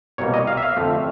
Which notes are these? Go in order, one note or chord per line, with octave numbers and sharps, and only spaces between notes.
C2 B2 G3 A#3 C#5
D#5
F5
E5
F5
F2 D3 F3 A3 C4